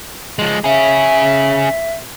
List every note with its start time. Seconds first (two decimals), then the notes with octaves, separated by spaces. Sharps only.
0.39 F3 G#3
0.64 C#4 G#4 E5